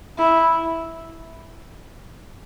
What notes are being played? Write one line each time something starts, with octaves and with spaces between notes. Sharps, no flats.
E4